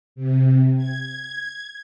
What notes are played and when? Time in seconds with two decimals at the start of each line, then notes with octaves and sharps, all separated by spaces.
0.16 C3
0.77 G#6